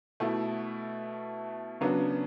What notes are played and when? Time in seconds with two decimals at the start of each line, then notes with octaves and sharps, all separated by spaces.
0.20 B2 A3 E4
1.81 C#3 F#3 B3 D4